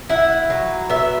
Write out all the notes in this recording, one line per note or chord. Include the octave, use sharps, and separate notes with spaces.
E4 F#5
F#3
B3 E5